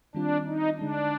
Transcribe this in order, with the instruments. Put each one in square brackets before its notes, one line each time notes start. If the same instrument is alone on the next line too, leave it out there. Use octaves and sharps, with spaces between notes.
[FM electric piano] D#3 G3 C4 F4 [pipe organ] D4
[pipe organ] D#4
[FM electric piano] D3 G#3 D#4 [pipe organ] D4